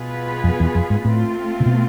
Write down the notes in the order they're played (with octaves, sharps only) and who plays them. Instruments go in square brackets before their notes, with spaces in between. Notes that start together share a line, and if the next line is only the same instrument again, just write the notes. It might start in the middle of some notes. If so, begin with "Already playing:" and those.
Already playing: [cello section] B2 B3 F4 G#4 B4
[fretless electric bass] F2
E2
F2
G#2
[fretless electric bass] A2 [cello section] A3 C4 F4
[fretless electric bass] C3
B2